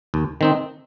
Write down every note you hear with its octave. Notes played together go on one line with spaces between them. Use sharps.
D#2
D#3 C4 D#4